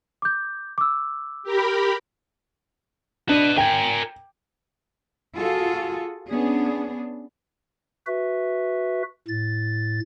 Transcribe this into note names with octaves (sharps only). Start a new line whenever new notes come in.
D6 G6
D6 E6
G4 A#4 B5
D4 B4 D#5
A#4 G5 G#5
F4 F#4 G#4 A4
B3 C#4 D4 G#4
F#4 B4 E5
A2 A6